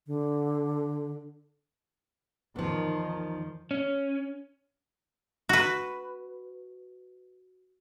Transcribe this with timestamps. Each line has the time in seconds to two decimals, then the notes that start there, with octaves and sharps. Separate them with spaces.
0.07 D3
2.56 E2 D#3 F3
3.71 C#4
5.49 F#4 B4